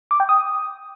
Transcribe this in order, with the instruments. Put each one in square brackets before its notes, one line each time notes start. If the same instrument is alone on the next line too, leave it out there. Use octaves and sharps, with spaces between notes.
[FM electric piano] D6
G5
D#6